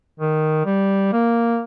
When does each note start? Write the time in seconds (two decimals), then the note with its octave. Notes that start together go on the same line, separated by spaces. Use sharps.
0.20 D#3
0.66 G3
1.13 A#3